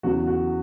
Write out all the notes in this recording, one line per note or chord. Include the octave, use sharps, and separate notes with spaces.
E2 C#3 F#3 F#4
F#4